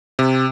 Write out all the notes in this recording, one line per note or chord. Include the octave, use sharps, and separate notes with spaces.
C3